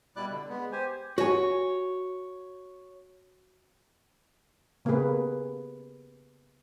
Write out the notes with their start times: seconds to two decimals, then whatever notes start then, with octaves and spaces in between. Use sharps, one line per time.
0.16 B2 G3 E4 D5 D6 F#6
0.30 D3
0.49 G#3 B3
0.72 G4 C5 G#5
1.18 F#4 C#5 G#5
4.85 C#3 A#3 B3 G4 G#4 B4